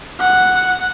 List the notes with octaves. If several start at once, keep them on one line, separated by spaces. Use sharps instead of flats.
F#5